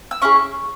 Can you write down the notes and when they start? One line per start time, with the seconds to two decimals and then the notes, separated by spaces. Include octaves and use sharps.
0.11 E6
0.22 C#4 E4 G#4 C#6